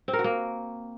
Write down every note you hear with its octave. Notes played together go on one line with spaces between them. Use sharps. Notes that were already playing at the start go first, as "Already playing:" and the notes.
C4
A#4
F#4
A#3